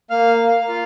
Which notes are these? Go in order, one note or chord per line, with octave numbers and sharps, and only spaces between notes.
A#3 F5 F6
A#3
F4